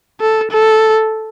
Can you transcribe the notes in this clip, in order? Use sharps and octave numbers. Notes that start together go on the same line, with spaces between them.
A4
A4